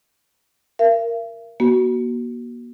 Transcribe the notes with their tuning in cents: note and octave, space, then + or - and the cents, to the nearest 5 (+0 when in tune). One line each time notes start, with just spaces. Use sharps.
A#4 +0 E5 +45
A#3 +45 F#4 +15